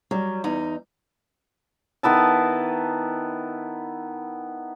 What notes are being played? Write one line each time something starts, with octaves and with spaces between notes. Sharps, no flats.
F#3 G3
E2 D#4
D#3 B3 E4 A5